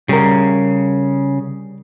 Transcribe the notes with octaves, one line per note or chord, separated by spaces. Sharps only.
C#3 G3 A#4